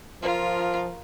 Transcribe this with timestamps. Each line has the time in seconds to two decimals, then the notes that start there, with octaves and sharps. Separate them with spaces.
0.22 F3 F4 A#4